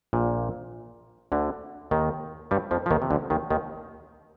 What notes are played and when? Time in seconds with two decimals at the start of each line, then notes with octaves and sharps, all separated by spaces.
0.13 A#1 A#2
1.32 D2 D3
1.91 D#2 D#3
2.51 G2 G3
2.71 F2 F3
2.86 F3
2.91 D#2 D#3
3.02 C3
3.11 D2 D3
3.30 D#2 D#3
3.50 D#2 D#3